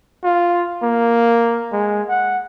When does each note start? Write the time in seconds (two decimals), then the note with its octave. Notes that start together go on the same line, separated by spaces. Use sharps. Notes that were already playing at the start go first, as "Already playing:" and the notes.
0.23 F4
0.83 A#3
1.72 G#3
2.09 F#5